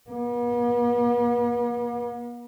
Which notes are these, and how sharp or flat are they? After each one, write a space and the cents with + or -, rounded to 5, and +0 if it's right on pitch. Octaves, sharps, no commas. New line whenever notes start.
B3 -45